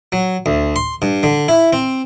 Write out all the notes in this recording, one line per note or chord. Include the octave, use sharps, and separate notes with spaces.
F#3
D2
C6
G2
D3
E4
C4